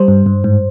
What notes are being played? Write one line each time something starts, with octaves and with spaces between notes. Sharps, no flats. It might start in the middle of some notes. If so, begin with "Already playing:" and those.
Already playing: G3 C5
G2
G2
G#2